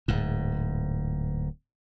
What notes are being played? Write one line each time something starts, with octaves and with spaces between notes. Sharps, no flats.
D1 G#2